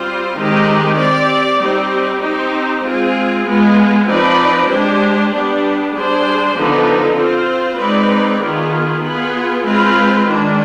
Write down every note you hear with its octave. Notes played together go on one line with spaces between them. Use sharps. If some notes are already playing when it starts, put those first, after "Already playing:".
Already playing: G3 C4 F4 C5
D#3 G#3 C4 D#4 G4
C4 G4 D5
G3 C4 D#4 G4
C4 D#4 G4 C5
G#3 C4 F4 G#4
G#3 B3 F4
F3 C4 D#4 B4 D5
G#3 D4 G4 C5
G3 B3 D4 G4
G3 D4 G#4 C5
D3 F3 B3 D#4
C4 F4 C5
G#3 C4 D#4 B4 D5
D#3 B3 F4 G#4
B3 F4 G#4
G#3 C4 F4 B4
D#3 G#3 D4